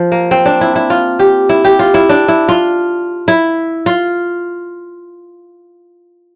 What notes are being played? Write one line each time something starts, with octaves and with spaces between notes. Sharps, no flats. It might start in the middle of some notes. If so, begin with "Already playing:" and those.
Already playing: F3
A#3
C4
D4
E4
E4
F4
G4
E4
G4
F4
E4
D4
E4
F4
E4
F4